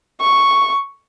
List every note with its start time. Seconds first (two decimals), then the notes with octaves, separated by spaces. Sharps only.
0.21 C#6